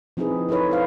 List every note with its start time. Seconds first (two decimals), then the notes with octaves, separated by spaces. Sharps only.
0.17 F3 C4 D#4 E4 G#4 B4
0.49 D#4 E4 A4 B4 C#5
0.70 A4 C5 F5